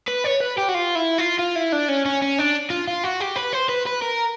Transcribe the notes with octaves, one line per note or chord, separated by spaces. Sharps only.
B4
C#5
B4
G4
F#4
F4
E4
F4
F4
E4
D4
C#4
C#4
C#4
D4
F4
F4
F#4
G4
B4
C5
B4
B4
A#4